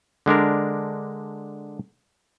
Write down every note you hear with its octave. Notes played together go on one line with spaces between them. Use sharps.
D3 G#3 D4 A#4